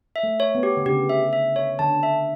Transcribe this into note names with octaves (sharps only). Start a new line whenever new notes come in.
E5
A3
C#5
B3
G4
D3
C#3 G4
E5
E5
C#5
D3 A5
E5